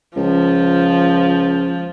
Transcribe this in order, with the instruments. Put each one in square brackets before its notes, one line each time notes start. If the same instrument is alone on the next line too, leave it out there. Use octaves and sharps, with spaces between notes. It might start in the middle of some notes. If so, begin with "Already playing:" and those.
[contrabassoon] C#2 [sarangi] F3